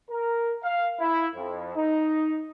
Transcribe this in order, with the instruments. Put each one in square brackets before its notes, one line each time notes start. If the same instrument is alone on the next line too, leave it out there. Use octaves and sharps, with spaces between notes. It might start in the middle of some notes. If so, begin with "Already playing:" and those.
[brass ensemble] A#4
F5
E4
F2
D#4